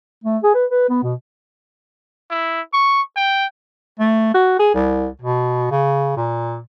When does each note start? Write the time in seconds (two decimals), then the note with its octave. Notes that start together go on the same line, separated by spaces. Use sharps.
0.24 A3
0.43 G#4
0.54 B4
0.70 B4
0.89 B3
1.03 B2
2.31 E4
2.73 C#6
3.17 G5
4.00 A3
4.34 F#4
4.59 G#4
4.74 C2
5.21 B2
5.71 C#3
6.17 A#2